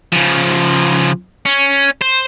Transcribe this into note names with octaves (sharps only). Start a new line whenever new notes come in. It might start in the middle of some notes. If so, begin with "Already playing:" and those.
C#3 F3
C#4
C5